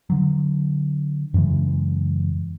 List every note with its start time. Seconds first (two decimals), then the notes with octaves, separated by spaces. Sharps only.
0.10 D3 F#3
1.34 F#2 C#3 E3 G#3